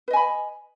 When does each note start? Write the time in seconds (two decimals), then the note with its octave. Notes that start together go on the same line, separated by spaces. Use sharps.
0.08 B4
0.11 D#5
0.13 G#5
0.16 B5